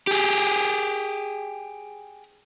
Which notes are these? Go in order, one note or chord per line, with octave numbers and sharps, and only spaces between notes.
G4 G#4